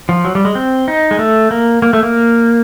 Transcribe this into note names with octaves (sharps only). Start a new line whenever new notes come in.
F3
F#3
G3
G#3
C4
D#4
G#3
A3
A#3
A#3
A3
A#3